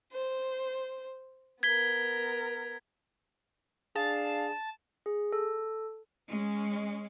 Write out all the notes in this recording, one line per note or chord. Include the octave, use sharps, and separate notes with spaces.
C5
B3 A#4 G#6 B6 G7
D4 G#4 F5 A5
G#4
A4
G#3 C#4